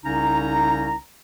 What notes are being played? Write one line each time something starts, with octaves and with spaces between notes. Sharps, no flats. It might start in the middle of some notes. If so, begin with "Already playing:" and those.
C2 C#3 C#4 D#4 A#5